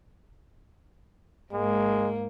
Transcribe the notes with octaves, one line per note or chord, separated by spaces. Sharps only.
G#2 G#3 A#3